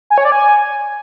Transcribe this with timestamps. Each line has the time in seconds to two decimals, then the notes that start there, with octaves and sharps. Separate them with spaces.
0.10 G#5
0.18 C#5
0.25 D5
0.32 G#5